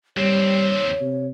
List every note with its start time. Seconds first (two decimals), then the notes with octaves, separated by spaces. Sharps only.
0.17 D#2 G3 C4 C#5
1.01 C3